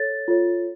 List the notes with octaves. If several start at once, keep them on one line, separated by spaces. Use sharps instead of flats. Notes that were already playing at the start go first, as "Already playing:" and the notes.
Already playing: A4 C#5 A6
F4 A4 C#5